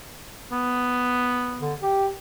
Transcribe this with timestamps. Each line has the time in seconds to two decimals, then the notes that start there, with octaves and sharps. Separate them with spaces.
0.52 B3
1.60 D3
1.82 G4